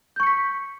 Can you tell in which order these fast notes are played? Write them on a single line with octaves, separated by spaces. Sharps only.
G6 C#6 C#7 B6